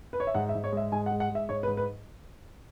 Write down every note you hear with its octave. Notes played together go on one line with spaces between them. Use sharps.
B4
C#5
E5
G#2 F#5
E5
G#2
C#5
G#3 E5
G#2 G#5
F#5
G#3
F#5
G#3
E5
G#2 C#5
B4
G#2
B4